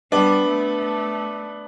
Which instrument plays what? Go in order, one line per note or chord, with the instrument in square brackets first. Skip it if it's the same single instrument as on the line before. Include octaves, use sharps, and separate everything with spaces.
[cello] G3 [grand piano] B3 D4
[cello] A3